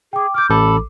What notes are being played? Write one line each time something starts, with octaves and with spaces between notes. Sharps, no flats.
G#4 G5 D6
D6 F6 G6
A1 A4 B5 D6